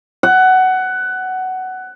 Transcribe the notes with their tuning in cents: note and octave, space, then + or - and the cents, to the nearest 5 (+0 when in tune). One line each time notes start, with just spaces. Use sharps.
F#5 +15